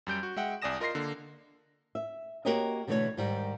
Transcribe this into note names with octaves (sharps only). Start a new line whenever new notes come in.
F#2 G3 G6 D7
F#4
G#3 E5 F#5 G5
C2 D5 G#5 D#6 A#6 E7
F4 A#4 D#5 C6 A#6 C7
D3 A#3
E5
A#3 F#4 G4 A#4 C#5 D#5
B2 D3 E3 A3 B4 C#5
G#2 D#3 G3